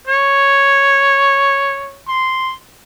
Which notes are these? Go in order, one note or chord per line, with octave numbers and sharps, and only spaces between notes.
C#5
C6